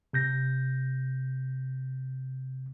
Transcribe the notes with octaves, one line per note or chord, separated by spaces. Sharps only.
C3 G6 A#6